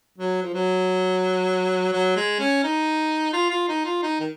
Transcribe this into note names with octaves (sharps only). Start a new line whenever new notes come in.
F#3
F3
F#3
F#3
G#3
C#4
D#4
F4
F4
D#4
F4
D#4
D#3